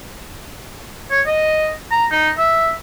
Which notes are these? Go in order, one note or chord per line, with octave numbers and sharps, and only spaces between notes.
C#5
D#5
A#5
D#4
E5